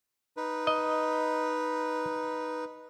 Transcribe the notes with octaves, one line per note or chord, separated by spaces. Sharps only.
D#4 B4
D#5